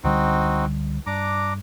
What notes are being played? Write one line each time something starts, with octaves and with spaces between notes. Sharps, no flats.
C#2 D3 G3 C4 D#4 F#4
G2 D4 A#5 D6